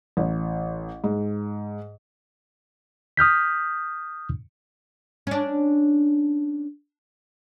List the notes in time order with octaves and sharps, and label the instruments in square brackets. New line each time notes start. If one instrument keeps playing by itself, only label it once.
[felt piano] A1
G#2
[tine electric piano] D#6 F6 G6 B6
[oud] C#4 D4